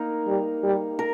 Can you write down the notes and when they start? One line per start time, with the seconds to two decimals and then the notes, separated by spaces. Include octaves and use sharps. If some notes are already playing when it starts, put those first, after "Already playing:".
Already playing: A#3 D#4 A#4
0.27 G3
0.63 G3
0.99 A#4